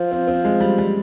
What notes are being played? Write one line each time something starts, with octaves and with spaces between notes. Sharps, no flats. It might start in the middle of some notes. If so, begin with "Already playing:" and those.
Already playing: F3
C4
C4
G#3
G3
G3